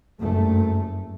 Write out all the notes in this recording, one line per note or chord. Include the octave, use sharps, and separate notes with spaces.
F#1 G2 A3